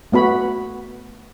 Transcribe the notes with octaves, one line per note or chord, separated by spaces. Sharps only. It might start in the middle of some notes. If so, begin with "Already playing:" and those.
A3 B3 F#4 B5